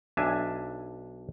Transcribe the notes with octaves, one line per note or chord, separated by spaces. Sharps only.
B1 D4 E5 G#5